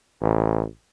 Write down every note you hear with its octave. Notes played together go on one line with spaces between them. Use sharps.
A1